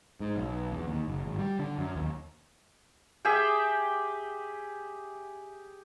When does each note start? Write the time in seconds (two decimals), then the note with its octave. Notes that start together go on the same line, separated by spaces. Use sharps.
0.20 G#2
0.36 B1
0.72 E2
0.88 D#2
1.08 F#1
1.25 G#1
1.39 G3
1.59 D3
1.78 F#2
1.95 D#2
3.25 G4 G#4 E5 G5